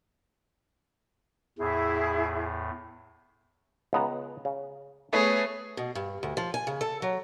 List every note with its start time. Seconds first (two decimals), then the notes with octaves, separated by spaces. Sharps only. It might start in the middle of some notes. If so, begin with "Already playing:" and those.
1.59 E2 A2 E4 G#4
3.93 C#2 B3 A#5
4.45 C#3
5.13 A3 B3 G#4 B4 C#5
5.77 B2
5.95 G2
6.23 D2
6.37 F3
6.54 G#5
6.67 C#3
6.81 A4
7.02 F#3